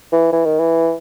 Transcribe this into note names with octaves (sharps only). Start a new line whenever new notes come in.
E3
E3
D#3
E3